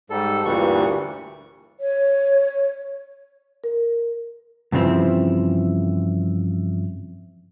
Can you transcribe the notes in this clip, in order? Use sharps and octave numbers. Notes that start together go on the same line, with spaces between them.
G#2 G3 A4
D2 G2 A#2 E3 G3 C#6
C#5
A#4
G2 C#3 E3 F3 C4 E4